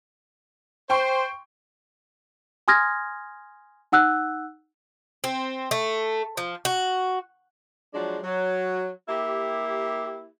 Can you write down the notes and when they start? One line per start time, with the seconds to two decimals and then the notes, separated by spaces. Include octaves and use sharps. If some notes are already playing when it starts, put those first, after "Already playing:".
0.90 C5 G5 C6 C#6
2.68 G#5 C6 D#6 F6 G#6 A#6
3.92 D#4 F#5 E6 F#6
5.24 C4
5.71 A3
6.37 F3
6.65 F#4
7.93 F3 F#3 G#3 D4
8.22 F#3
9.08 A#3 E4 G4